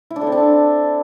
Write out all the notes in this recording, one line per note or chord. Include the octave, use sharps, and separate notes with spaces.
E4
D4
A4
C4
D4